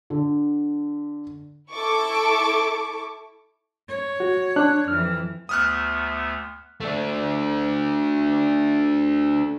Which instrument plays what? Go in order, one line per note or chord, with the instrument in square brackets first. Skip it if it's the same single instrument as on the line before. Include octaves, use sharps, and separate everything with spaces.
[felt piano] D3
[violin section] E4 A4 C#6 D6
[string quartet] C#5
[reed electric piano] F#4
D4 F#6
[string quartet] F2 E3 [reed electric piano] F6
[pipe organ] D2 A3 B3 [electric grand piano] D#6 F6 F#6
[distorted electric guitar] A3 D4